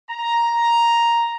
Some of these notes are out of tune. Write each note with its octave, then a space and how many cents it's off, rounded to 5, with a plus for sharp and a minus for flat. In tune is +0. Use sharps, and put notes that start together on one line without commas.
A#5 +5